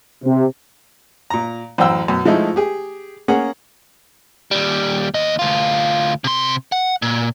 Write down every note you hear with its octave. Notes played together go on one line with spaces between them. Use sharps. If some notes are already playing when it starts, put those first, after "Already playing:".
C3
A#2 A#5
A1 F#2 C5 F#5 G5 E6
F#2 B2
F3 G#3 A3 D#4 E4
G4 G#4
A#3 C#4 G#4 F#5
D#2 G3
D#2 D#5
D2 F4
C3 C6
F#5
A#2